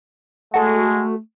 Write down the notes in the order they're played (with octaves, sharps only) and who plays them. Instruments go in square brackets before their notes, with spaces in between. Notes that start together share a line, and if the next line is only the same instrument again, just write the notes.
[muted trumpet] G#3 [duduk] A3 [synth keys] F#4 A4